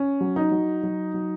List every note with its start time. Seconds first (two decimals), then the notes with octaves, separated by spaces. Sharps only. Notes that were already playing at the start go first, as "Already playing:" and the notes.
Already playing: C#4
0.21 F#3
0.36 D#4
0.52 F#3
0.83 F#3
1.14 F#3